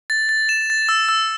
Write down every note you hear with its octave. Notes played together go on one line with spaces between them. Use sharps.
A6
A6
E7
A6
E6
E6